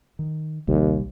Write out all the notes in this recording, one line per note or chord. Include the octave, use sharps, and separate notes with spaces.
D#3
A#1 D#2 C3 G3